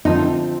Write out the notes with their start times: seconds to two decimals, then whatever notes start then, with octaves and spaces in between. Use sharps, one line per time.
0.05 D3 F3 C4 D#4